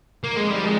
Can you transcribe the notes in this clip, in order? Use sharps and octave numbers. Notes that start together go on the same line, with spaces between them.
D3 F3 A#3 C4 D#4
G#3
G3
G#3